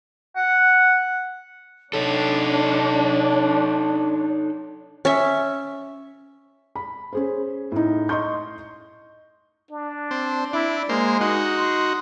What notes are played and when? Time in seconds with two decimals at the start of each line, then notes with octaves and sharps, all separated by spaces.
0.36 F#5
1.93 D4 D#4 A4 C#5
5.05 C#4 E5
6.76 B5
7.13 C#4 G#4 C5
7.72 A2 D#4
8.09 D#5 C6 C#6 G6
9.71 D4
10.11 C4
10.53 D4 E4
10.89 G#3 A#3 C5
11.21 D#4 F#4
11.57 C6